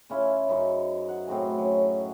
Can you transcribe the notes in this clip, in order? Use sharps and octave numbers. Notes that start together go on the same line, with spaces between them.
C#3 C#4 E4 F4
F#2 D#4 C5 C#6
F#5
A2 C4 F#4 G#4
F#3 C#4